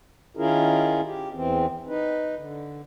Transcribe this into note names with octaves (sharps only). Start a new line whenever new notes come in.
D#3 C#4 E4 F4 G#4 A#4
G4
E2 E3 C4
D#4 B4
D3